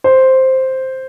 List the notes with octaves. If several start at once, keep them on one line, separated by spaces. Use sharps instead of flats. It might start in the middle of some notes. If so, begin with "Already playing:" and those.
C5